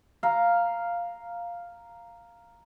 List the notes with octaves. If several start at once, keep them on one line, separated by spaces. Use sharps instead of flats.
F5 A#5